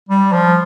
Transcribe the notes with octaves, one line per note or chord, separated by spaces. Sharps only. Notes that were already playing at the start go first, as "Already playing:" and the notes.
G3
F3